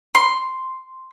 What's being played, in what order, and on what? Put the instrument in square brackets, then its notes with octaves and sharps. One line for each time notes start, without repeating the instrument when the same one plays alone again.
[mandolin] C6